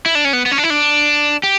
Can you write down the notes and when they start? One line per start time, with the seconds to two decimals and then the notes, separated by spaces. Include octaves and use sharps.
0.06 E4
0.15 D4
0.25 C#4
0.33 B3
0.46 B3
0.52 C#4
0.58 D4
0.64 E4
0.70 D4
1.43 G4